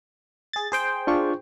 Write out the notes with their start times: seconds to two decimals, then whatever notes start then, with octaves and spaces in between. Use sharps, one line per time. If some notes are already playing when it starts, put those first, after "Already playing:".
0.53 G#4 A6
0.72 G#4 C5 G5
1.07 D4 F4 C#6